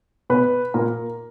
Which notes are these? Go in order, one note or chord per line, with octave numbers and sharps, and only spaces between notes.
B2 B4
A#2 A#4